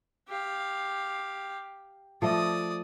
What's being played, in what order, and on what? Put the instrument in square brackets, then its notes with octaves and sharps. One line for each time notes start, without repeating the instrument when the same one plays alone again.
[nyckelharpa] G4 F5
[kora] F3 A3 D#5 [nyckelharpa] D5 D#6